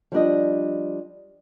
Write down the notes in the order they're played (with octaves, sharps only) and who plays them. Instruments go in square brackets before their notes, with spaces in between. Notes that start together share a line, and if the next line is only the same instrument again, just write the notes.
[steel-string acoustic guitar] F3 G3 D4 D#5